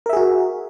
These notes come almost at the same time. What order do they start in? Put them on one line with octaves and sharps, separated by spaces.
A#4 E5 G#4 F#4